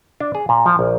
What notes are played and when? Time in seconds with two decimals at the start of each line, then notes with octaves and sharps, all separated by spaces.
0.20 D4
0.35 G#4
0.49 A#2
0.66 F3
0.79 A#1